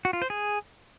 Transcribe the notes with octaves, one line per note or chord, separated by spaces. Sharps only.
F#4
F4
C5
G#4